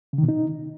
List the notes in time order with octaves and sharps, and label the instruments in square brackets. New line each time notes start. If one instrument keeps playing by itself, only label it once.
[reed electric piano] C#3
D#3
B2
D#4